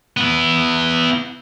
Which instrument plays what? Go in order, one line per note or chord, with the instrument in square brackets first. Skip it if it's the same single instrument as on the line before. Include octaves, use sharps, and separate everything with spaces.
[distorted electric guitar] B3 E4